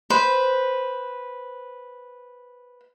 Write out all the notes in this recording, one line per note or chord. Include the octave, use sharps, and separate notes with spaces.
B4 C5